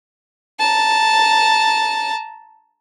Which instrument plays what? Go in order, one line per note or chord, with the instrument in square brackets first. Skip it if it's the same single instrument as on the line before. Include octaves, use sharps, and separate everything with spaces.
[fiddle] A5 A#5